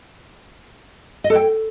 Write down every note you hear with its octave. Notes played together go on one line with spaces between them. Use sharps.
D#5
A4
G5